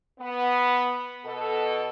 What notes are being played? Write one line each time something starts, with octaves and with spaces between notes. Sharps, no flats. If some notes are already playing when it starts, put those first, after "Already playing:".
B3
B2 A4